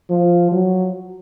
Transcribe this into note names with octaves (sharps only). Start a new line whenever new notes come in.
F3
F#3